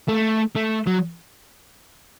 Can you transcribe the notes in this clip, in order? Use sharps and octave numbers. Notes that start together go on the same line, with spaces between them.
A3
A3
F#3